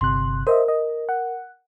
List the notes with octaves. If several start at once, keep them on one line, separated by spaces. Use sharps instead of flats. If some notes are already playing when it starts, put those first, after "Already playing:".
G1 C3 C6 F#6
A#4 C5 D#5 E5
D#5
F#5